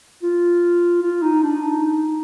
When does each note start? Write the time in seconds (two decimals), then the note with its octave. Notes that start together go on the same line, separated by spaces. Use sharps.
0.23 F4
1.02 F4
1.22 D#4
1.43 D4
1.62 D#4